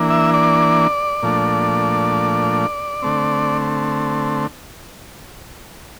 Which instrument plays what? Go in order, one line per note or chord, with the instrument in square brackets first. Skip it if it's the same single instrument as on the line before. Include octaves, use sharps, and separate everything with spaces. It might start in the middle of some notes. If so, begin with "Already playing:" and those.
Already playing: [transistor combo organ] E3 A#3 D4
E5
D5
A#2 F3 A3 D4
D3 A3 C4